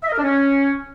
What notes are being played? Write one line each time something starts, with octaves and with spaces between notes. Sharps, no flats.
E5
D#5
A#4
D4
C#4